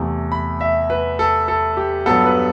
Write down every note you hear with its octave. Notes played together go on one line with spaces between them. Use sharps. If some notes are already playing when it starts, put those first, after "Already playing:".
Already playing: E2 C3 E3 A3
B5
E5
B4
A4
A4
G4
G2 F#3 B3 A4
B4